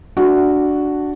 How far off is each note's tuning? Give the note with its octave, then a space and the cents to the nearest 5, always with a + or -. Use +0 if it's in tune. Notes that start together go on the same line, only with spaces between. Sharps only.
D4 +0 F#4 +0